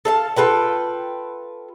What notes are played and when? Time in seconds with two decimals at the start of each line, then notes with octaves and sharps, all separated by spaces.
0.05 A4 F5 A5
0.36 F4 A4 B4 G5